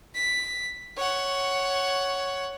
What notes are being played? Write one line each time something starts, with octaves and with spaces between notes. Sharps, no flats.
B6
C#5 F#5